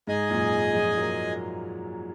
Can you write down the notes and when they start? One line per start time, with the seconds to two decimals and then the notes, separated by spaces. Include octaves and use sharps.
0.07 G#2 G#4 D#5 G#5
0.30 F#2 A#2
0.74 F3 G#3
0.97 F#3 A#3